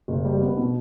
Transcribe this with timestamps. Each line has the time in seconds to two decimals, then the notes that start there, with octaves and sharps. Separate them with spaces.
0.08 F#1
0.25 G3
0.41 B3
0.57 B2